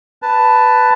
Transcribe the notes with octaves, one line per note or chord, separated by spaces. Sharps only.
B4 A5